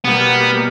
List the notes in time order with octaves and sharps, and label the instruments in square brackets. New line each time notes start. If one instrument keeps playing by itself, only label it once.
[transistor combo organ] B2 G3 A#3 [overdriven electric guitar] B3